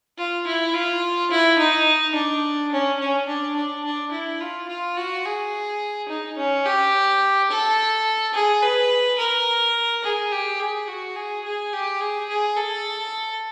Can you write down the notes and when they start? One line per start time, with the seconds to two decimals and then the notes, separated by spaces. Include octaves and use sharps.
0.18 F4
0.47 E4
0.74 F4
1.31 E4
1.58 D#4
2.15 D4
2.72 C#4
2.99 C#4
3.28 D4
3.56 D4
3.84 D4
4.12 E4
4.40 F4
4.68 F4
4.97 F#4
5.25 G#4
6.09 D#4
6.37 C#4
6.65 G4
7.51 A4
8.34 G#4
8.62 B4
9.18 A#4
10.04 G#4
10.32 G4
10.60 G#4
10.88 F#4
11.16 G#4
11.44 G#4
11.73 G4
12.01 G#4
12.29 G#4
12.56 A4